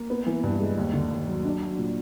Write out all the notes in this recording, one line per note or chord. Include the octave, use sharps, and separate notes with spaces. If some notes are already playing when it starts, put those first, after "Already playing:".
Already playing: A#3
B3
E3
G2
G#3
D#2
D3
D#2
F#3
D4
F#3
A#2